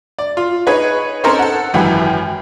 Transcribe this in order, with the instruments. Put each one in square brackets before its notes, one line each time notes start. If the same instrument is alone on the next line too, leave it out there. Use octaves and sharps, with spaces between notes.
[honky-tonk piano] D5
F4
D#4 G#4 B4 C#5
C4 C#4 D#4 A4 A#4 C5
A4 F#5
G#1 F#2 E3 G4 B5